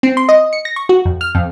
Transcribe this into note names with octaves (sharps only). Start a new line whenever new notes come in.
C4
C6
D#5
C#7
A#6
C#6
F#4
F2
F6
F2